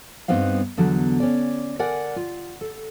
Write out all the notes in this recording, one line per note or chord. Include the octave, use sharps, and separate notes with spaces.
G2 B3 C4 D#4 F5
E2 D3 F#3
C#4 D5
A#4 D5 F#5 G#5
F4
A4